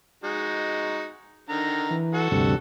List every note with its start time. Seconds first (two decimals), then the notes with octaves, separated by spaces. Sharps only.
0.24 G#3 D#4 F#4
1.49 D3 D#3 A#5
1.90 E3
2.14 F#4 A4 F#5
2.31 D2 G2 C3